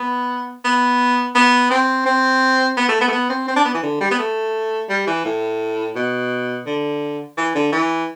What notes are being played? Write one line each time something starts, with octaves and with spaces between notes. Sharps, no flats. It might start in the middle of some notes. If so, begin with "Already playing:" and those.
Already playing: B3
B3
B3
C4
C4
B3
A3
B3
A3
B3
C4
C4
D4
B3
E3
D3
G3
B3
A3
G3
E3
A2
B2
D3
E3
D3
E3